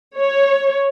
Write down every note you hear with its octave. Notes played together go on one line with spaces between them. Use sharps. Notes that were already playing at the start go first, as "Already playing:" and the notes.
C#5